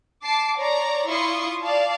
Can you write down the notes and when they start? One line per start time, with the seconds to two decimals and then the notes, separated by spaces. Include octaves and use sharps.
0.24 A5 D6 C7
0.58 C#5 D5 A#5
1.07 E4 F4 C6 C#6 D#6
1.63 D5 F5 A5